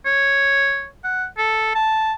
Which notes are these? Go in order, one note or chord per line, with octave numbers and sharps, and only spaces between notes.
C#5
F#5
A4
A5